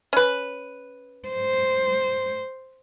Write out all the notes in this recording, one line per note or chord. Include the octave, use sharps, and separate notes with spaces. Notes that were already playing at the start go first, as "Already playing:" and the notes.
C#4 B4
C5